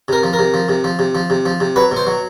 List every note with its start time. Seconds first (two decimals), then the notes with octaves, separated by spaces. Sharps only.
0.08 C3 A#4
0.23 F3
0.33 A#4
0.39 C3
0.54 F3
0.69 C3
0.84 F3
0.99 C3
1.15 F3
1.30 C3
1.45 F3
1.60 C3
1.76 F#3 B4
1.91 B2
1.96 C5
2.07 F#3